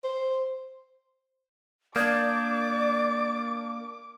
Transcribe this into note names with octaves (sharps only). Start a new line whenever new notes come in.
C5
A#3 D4 D5 D6 D#6 G6 G#6